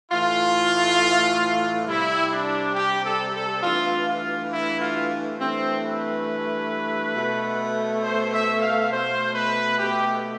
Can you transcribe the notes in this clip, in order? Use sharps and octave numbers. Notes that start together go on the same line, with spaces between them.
A2 E3 A3 F4
C3 G3 E4
D4
G4
A4
A4
G2 E3 A3 F4
F4
E4
F4
G2 E3 A3 C4
B4
B2 A3
C5
E5
F5
B2 A3 C5
B4
G4